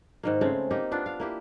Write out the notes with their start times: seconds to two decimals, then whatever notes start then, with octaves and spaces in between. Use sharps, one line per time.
0.23 G#2 D#3 A#3
0.41 C#3 G#3 A3 C4
0.71 A#3 D#4 G4
0.91 B3 D4 F4
1.06 F5
1.20 A#3 E4 G4